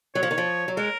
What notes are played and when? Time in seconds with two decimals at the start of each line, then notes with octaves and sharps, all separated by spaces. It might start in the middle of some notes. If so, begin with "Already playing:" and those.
0.15 F#3 C#5
0.23 F3
0.31 D#3
0.38 F3
0.68 F#3
0.77 G#3 A#4